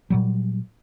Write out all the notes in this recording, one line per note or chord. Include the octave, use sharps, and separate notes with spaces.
A#2 F#3 G3